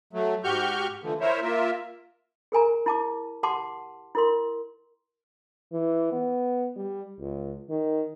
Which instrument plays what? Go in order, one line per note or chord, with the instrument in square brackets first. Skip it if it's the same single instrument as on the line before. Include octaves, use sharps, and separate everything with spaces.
[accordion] F#3 A3
G#2 F#4 G4 C#6 F6 G6
D3 E3 F3 A3
E4 A#4 C5 C#5 E5
A#3 F4 A#4 E5
[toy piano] G#4 A#4 G#5 A#5
E4 A5 D6
G4 F#5 A5 C6 D6
E4 A#4 C6
[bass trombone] E3
B3
G3
C#2
D#3